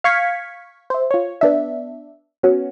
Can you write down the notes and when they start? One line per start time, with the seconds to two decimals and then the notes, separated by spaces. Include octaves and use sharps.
0.04 F5 C#6 G#6 B6
0.90 C5 E5
1.11 F4 C#5
1.41 B3 D4 E5
2.43 B3 C#4 F#4